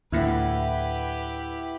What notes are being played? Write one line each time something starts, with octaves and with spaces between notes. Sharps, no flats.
D2 A2 E4 G4 B4 F#5